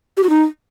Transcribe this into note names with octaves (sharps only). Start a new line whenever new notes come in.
G4
F#4
D#4